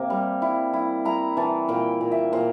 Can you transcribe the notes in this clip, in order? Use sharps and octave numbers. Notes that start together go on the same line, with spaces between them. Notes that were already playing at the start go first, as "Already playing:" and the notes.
Already playing: C3 A#3
G3
E4
E4
E4 A#5
E3 A5
A#2 G5
A#2
E5
A#2 C5